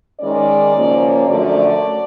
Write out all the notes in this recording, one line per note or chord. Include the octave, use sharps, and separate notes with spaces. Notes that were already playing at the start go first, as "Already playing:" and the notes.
D#3 G#3 C#4 D5
F#2 C#3 F3 A#3 C#4
F#2 D3 F3 A3 D5